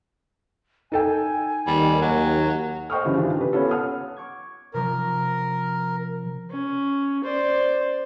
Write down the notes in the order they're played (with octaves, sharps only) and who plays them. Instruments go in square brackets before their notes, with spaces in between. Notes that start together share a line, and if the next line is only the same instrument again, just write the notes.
[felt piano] D#4 A4 G5 [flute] G#5
[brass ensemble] D#2 [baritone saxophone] G3
[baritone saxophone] F#3
[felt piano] C5 D#5 G5 C#6 D#6 F6
G2 C#3 E3
D#3 E3 D4 F4
C3 B4
B3 C#4 F4 A4
F#5 D#6 F6
[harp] C#6 D6 G#6
[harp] C3 F3 C#4 [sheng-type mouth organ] A#4
[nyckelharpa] C#4
C5 D5